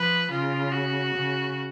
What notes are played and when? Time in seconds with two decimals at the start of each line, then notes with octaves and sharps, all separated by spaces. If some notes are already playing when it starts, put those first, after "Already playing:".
Already playing: F3 B4
0.31 C#3 F4
0.72 F#4
1.14 C#3